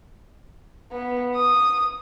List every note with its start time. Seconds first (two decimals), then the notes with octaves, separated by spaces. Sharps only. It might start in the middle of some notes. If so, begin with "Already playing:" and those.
0.92 B3
1.35 D#6